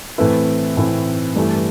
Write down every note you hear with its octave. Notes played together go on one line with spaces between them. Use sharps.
A2 E3 A3 C4 E4 B4
A2 E3 A3 C4 E4
G2 E3 A3